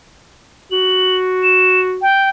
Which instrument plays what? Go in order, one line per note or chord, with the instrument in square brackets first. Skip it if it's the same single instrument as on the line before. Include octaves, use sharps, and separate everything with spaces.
[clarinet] F#4 [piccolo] F#7
[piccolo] E7
G5